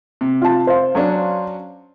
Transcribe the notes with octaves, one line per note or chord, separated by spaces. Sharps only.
C3
F4 A5
C5 F5
F#3 C#4 D4